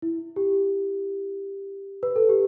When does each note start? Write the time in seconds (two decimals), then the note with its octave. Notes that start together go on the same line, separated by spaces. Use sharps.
0.02 E4
0.36 G4
2.03 B4
2.16 A4
2.29 G4